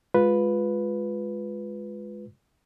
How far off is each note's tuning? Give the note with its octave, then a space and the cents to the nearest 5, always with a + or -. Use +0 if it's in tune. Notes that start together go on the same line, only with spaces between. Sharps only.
G#3 +0 F4 +15 B4 +0